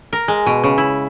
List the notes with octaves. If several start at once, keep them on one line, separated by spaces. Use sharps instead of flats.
A#4
G#3
B2
C#3
E4